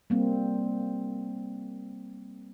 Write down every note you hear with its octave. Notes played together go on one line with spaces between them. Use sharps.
G3 A#3 C4